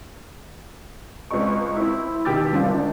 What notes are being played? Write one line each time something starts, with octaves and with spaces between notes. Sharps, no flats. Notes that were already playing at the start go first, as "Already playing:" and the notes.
C#2 C4 D#5 C#6
C4 E4
B2 D#3 G4 D6 E6 A6
G2 D3 C4 F4
G#1 D4